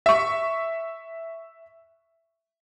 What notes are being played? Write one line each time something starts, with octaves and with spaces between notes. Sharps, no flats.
E5 C#6